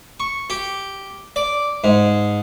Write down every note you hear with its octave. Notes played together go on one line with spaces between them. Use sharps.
C#6
G4
D5
G#2